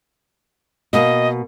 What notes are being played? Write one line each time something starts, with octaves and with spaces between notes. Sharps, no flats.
B2 A#3 D#5